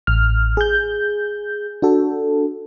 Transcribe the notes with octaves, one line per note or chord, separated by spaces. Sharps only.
A1 F6
G#4 G6
D4 F#4 A4